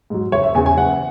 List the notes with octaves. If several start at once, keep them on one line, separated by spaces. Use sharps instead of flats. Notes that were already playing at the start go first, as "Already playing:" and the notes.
G#2 F#3
F#1 C#5
E5
E2 C#3 G#5
G#5
F#1 F#5